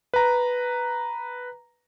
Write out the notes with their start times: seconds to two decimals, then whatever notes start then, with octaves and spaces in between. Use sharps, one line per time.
0.14 B4 A#5